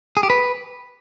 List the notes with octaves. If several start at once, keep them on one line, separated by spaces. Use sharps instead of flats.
G#4
G4
B4